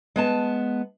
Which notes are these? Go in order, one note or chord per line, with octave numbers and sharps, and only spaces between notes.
G#3 B3 A5